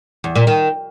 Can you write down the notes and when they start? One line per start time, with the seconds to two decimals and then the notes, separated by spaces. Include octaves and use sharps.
0.24 E2
0.36 A#2
0.47 D#3